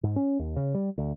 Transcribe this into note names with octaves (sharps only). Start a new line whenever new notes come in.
G#2
C#4
D#2
C#3
G3
D2